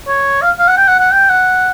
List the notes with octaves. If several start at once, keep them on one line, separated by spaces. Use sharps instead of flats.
C#5
F5
F5
F#5
G5
F#5
F#5
G5
F#5